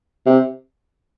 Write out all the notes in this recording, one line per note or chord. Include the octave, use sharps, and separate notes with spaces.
C3